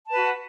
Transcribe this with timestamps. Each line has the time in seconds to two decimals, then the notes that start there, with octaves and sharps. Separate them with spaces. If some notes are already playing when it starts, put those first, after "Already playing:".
0.07 A5
0.11 B4
0.15 F#4
0.19 F#5